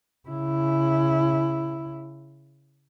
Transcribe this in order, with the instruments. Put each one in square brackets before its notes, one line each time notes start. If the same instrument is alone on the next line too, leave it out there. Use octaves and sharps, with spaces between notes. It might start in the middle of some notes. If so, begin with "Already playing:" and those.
[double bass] C#3 E4